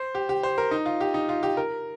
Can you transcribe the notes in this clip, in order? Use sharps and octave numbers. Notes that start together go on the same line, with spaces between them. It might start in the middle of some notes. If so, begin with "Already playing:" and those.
Already playing: C5
G4
G4
C5
A#4
D#4
F4
G4
D#4
F4
G4
A#4